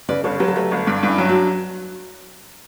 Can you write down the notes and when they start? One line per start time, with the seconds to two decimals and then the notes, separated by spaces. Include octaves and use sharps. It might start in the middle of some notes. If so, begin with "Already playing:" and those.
0.09 C#3 B4 D5
0.24 G1 A4 C#5
0.40 F#3 G4 B4
0.48 A4
0.55 A3 G4 B4
0.71 G1
0.87 G2
1.03 G2
1.08 C#4 E4
1.18 F#3
1.29 D4 F#4